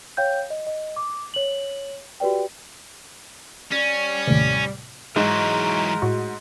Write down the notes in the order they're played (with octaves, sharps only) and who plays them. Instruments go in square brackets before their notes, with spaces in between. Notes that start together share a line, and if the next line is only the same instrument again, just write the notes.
[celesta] C#5 F5 G5 G6
D#5
D#5
D6
C#5 F#7
F#4 G4 B4 D5 G5
[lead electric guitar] G3 D5 [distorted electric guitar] C#4
[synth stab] D#2 A2 C3
[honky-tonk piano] G#2 [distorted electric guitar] E3 F#3 [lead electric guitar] A#4 A#5
[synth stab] A2 F#4